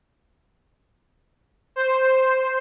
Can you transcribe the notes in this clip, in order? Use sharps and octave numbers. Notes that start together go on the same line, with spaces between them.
C5